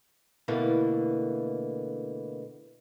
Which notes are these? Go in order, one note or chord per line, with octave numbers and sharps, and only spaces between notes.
B2 D3 E3 A3 A#3